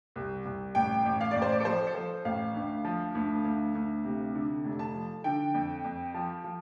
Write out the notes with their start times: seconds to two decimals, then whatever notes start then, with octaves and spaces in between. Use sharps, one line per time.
0.16 C2
0.45 C2
0.75 A1 G5
1.06 A1
1.21 F5
1.31 A1 D5
1.42 C5
1.52 D5
1.60 A4
1.65 F3 C5
1.87 A4
1.95 F3 C5
2.25 A1 F5
2.55 D2
2.85 F3
3.15 D2
3.45 D2
3.75 D2
4.05 C3
4.35 D3
4.64 F1
4.79 A5
4.95 F3
5.24 D3 G5
5.54 F2
5.84 F2
6.14 F3
6.44 F3